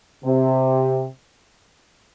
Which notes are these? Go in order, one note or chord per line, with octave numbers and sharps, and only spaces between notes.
C3